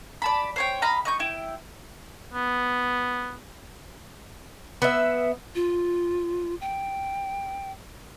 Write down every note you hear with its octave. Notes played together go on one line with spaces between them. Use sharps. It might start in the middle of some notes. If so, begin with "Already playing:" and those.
D5 A5 B5
C5 C#5 G5
D#5 F5 A#5 B5
D#5 C#6 G6
E4 G5
B3
B3 E5
F4
G5